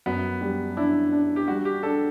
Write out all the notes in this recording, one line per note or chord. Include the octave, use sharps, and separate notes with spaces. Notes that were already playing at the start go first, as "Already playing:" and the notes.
F#2 B3
G3
D4 E4
D4
G4
G3 F#4
G4
D4 A4